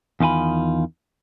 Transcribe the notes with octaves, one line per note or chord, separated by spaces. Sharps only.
E2 D#3 F4 G#5 B5